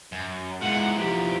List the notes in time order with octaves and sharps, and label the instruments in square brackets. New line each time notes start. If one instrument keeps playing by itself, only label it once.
[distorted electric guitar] F#2
[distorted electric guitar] E2 A#2 [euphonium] G#3 [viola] F#5
[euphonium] F3 [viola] G4